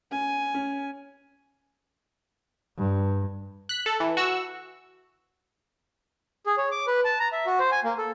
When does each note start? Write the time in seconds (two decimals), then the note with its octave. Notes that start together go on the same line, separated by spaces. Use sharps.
0.12 C#4 G#5
0.54 C#4
2.78 G2
3.69 F#6 B6
3.86 A4
4.00 E3
4.17 F#4 C#6 E6
6.46 G#4
6.58 C#5
6.71 D6
6.87 B4
7.05 A5
7.20 A#5
7.32 E5
7.46 F#4
7.59 C5
7.72 G#5
7.84 A#3
7.98 A4